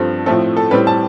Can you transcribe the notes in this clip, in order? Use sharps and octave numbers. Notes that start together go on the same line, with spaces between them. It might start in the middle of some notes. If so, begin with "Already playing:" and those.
Already playing: G2 F3 C4 A4
A2 F3 A3 C4 A4
A4
A2 G3 C4 B4
A5